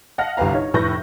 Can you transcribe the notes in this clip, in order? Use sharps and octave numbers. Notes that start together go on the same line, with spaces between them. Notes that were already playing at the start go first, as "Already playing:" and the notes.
D#5 F5 F#5 A5 F6 A#6
G1 C2 G4 B4 F5 A#5
D#4 C#5
F1 A2 B4 C#6 G6 A#6